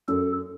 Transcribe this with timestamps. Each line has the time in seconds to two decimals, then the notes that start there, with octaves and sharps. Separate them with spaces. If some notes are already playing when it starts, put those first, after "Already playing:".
0.08 F#2 A4